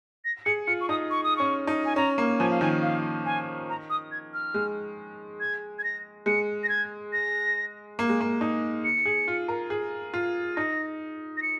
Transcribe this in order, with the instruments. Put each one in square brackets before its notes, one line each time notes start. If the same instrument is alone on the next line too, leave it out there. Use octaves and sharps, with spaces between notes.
[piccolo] A#6
[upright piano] G#4 [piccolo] C#7
[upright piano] F4 [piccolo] C#7
[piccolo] C#6
[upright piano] D#4 [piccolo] D#6
[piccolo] C#6
D#6
[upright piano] C#4 [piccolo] C#6
[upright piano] D#4
[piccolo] G#5
[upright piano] C#4 [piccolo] A#5
[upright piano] A#3
[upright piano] F3 [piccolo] G#5
[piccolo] F5
[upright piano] D#3 [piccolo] G#5
[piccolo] F5
G#5
A#5
D#6
G#6
F6
[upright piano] G#3
[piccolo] G#6
G#6
A#6
[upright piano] G#3 [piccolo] C#7
[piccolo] A#6
G#6
A#6
[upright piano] A#3
G#3
A#3
D#4
[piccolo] C#7
[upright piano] G#4
F4
A#4
G#4
F4
[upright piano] D#4 [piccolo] A#6
[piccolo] A#6
C#7